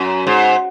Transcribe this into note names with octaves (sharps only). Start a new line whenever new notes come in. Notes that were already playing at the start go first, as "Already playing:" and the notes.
Already playing: F#2
G#2